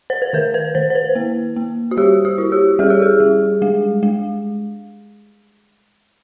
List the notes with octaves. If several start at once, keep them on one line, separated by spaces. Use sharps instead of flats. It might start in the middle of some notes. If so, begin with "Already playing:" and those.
C5
B4
D#3 A#4
B4
D#3 C5
C5
B4
A#3
A#3
F#4
G3 G4
F#4
E4
G4
G3 G#4
G4
G#4
G3
G#3
G#3